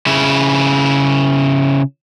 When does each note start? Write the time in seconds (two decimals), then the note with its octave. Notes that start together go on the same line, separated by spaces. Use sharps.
0.07 C#3 E4